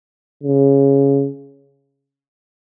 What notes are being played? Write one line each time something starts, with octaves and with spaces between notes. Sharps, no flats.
C#3